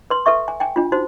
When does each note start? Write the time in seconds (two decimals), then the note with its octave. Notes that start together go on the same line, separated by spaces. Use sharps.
0.10 B4 C6
0.26 A4 B4 E5 C#6
0.48 G#5
0.60 G5 G#5
0.76 D4 F4
0.92 D#4 F#4 C5